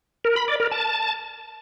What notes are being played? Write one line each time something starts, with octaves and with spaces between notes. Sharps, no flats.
A#4
B5
D5
A#4
A5